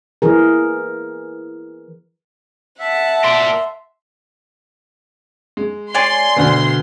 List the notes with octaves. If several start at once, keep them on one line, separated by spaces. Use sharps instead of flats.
E3 G#4 A#4
E5 F#5 A5
A#4 D5 C6
G#3
C#5 D5 G#5 C6
D2 B2